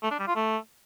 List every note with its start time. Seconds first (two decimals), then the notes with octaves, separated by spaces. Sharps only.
0.03 A3
0.11 D4
0.20 G3
0.28 F4
0.36 A3